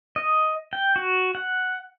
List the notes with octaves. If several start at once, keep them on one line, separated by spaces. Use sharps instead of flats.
D#5
G5
F#4
F#5